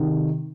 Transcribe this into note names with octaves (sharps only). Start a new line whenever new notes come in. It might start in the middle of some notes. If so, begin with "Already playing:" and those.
Already playing: C3 D#3